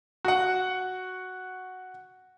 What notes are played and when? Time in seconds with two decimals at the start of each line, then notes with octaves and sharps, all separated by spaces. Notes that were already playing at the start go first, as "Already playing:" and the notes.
0.25 F#4 F#5